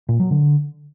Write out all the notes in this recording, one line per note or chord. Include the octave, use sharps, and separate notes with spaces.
A#2
F#3
D3